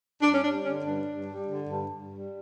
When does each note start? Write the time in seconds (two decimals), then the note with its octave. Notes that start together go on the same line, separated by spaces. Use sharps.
0.22 G2 D4
0.33 C#4
0.43 G3 D4
0.64 D3 C#4
0.85 G2 D4
1.07 G2
1.27 G3
1.48 D3
1.69 G2
1.90 G2
2.12 G3